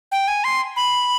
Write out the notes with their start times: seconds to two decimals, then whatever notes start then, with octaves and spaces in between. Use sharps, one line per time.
0.12 G5
0.28 G#5
0.44 C6
0.76 B5